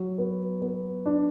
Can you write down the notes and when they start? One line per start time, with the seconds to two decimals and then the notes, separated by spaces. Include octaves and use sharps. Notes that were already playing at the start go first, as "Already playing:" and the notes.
Already playing: F#3
0.18 B3
0.62 B3
1.06 D4